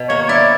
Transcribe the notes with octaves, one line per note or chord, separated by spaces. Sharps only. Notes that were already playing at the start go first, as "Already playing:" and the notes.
Already playing: B2
A#3 C#5
C#5
E4 D5